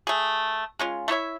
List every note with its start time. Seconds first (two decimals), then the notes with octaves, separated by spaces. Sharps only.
0.07 A3 G#4
0.79 G#3 C#4 F4
1.08 A3 E4 C#5 E5